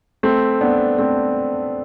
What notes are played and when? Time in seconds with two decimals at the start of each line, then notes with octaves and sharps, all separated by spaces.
0.23 A3 C4
0.61 B3 D4
0.99 A3 C4